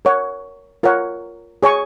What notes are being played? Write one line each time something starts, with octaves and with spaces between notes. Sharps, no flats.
A#4 C#5 F#5
F4 A#4 C#5 F#5
G#4 C#5 G#5 C#6